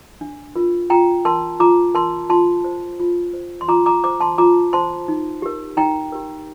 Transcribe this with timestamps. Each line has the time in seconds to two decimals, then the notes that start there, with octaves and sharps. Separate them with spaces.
0.21 D4
0.56 F4 A#4
0.90 F4 G5 A#5
1.25 A#4 A5 C6
1.60 F4 A#5 D6
1.95 A#4 A5 C6
2.29 F4 A5 C6
2.64 C5
3.00 F4
3.33 C5
3.61 C6
3.68 F4 A#5 D6
3.86 A#5 D6
4.04 C5 A#5 D6
4.21 A5 C6
4.38 F4 A#5 D6
4.73 C5 A5 C6
5.08 D#4
5.42 G4 A#4
5.77 D#4 G5 A#5
6.12 G4 A#4